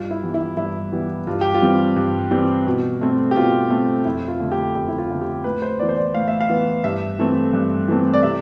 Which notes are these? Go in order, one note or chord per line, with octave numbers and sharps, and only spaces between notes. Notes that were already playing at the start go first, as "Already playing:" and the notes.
Already playing: G2 F4
E4
E3 G3 B3
E4
G2 E4
E3 G3 B3
G2 F4
G4
F4
E3 G3 C4
G2
E3 G3 C4
B2
A3 C4
G4
B2 F4
A3 C4
F2 E4
F4
D3 A3
G4
F2 G4
E4
F4
D3 A3
G4
A2 B4
C5
E3 B3 D5
C5
D5
A2 F5
E5
F5
E3 B3
G2 E5
E3 A3 C4
G2
E3 A3 C4
D5
C3 E5